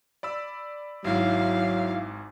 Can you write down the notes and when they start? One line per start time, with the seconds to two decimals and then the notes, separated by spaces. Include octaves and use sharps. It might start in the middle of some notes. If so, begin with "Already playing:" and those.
0.23 D5 B5 E6
1.04 G#1 G#2 F#3 E4 F5